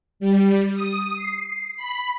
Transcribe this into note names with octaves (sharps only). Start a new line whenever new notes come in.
G3
D#6
C7
B5